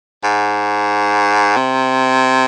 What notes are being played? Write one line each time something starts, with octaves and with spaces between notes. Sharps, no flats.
G#2
C3